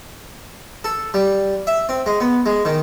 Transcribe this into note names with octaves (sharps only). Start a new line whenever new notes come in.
A4
G3
E5
C4
G#3
B3
G#3
D#3